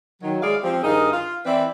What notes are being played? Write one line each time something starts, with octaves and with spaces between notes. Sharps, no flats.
D#3 F#3
G#3 E4 G#4 D5 F5
F3 C4 G4
G2 D#3 D#4 G#4 A#4 F5
F4
E3 C4 E4 B4 D5